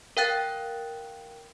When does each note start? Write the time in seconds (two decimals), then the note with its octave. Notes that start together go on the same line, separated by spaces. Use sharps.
0.17 A#4 F5 G5 F#6 A6